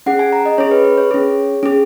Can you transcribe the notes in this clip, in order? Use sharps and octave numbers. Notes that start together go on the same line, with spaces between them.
C#4 G#4 F#5
G#5
A#5
D#5
C#4 G#4 C#5
B4
B4
C#5
C#4 G#4
C#4 G#4